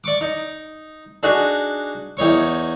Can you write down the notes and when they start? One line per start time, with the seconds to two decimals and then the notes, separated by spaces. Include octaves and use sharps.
0.04 D5 C#6 D6
0.21 D#4
1.23 D4 D#4 F#4 G#4
2.17 E2 D#4 C#5 C#6